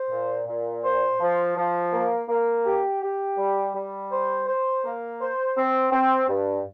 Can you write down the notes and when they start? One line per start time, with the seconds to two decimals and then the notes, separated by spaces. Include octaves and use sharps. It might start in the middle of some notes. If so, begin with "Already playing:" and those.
Already playing: C5
0.11 A#2
0.47 A#2
0.84 C5
1.20 F3
1.56 F3
1.93 A#3
2.29 A#3
2.65 G4
3.02 G4
3.38 G3
3.75 G3
4.11 C5
4.48 C5
4.84 A#3
5.20 C5
5.57 C4
5.92 C4
6.28 G2